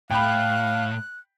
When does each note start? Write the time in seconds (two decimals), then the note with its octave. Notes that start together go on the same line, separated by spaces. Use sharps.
0.11 A2 F5 G5 B5 F#6